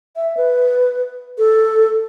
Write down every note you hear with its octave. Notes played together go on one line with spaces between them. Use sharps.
E5
B4
A4